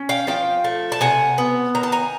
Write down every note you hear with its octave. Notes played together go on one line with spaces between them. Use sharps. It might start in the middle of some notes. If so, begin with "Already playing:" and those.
Already playing: C#4
F5 G5
F3 F5 G5
A3
A5
C3 F#5 G#5
B3
D#3 A#5
A5
G#5 A#5